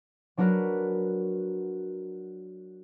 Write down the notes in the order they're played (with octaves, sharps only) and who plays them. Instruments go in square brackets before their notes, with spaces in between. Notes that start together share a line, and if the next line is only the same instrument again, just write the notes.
[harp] F#3 D4 F#4 A#4 B4